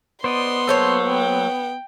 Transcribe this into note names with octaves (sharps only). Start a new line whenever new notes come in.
B3 C5 D5 D#5 C6
F#3 A3 A#3 C5 C#5 E6
G5